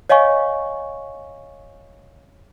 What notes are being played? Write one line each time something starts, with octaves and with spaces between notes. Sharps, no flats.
C#5 D#5 F5 G#5 C#6